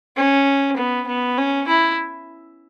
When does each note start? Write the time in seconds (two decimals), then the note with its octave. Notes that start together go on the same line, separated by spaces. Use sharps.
0.17 C#4
0.77 B3
1.07 B3
1.38 C#4
1.68 E4